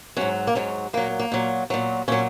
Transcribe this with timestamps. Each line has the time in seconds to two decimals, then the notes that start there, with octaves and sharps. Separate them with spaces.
0.17 G#2 F#3 C#4
0.47 A#3
0.55 G#2 F#3 C#4
0.93 A#2 F#3 A#3
1.19 A#3
1.32 A#2 F#3
1.70 A#2 F#3
2.08 A#2 F#3 C#4